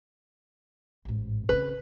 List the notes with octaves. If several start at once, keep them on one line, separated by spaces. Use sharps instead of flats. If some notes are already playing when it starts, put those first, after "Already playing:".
A1 G#2
C#3 C4 B4